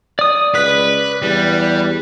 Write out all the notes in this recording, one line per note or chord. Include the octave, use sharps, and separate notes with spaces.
D5 D#6
C#2 B4 F#6
E2 G3